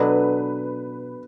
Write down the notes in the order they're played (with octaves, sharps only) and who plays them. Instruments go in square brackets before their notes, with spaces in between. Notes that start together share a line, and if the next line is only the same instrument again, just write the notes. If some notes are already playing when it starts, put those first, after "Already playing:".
Already playing: [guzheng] B2 F#3 D4 A4 [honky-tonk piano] B4